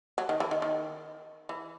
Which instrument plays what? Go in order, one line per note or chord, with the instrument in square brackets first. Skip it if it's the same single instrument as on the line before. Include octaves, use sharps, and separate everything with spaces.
[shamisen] F#3
D#3
E3
D#3
D#3
E3